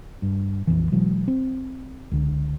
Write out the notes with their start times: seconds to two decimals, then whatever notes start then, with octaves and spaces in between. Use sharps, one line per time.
0.22 G2
0.67 A#1 F2 E3
0.92 B2 E3 F#3 G#3
1.28 C4
2.12 C#2 D3